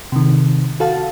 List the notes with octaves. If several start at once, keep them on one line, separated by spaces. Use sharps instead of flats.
C3 D#3
F#4 A4 F5 A5